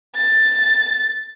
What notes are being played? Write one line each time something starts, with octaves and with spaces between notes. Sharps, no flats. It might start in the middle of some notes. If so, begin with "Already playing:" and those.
A6